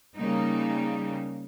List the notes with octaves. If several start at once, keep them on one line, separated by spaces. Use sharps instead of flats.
C#3 G3 A#3 D#4